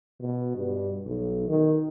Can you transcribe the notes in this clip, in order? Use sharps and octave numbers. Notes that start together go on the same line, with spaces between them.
B2
G2
B1
D#3